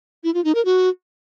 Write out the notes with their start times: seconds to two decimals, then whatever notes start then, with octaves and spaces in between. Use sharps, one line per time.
0.24 E4
0.34 F4
0.45 D#4
0.55 A#4
0.65 F#4